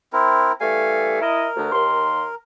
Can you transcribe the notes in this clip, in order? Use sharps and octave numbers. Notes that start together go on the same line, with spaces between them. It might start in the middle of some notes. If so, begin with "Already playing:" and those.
C4 E4 A#4
E3 G3 A3 F5 G#5
E4 A#4 D#5
D2
D#2 C6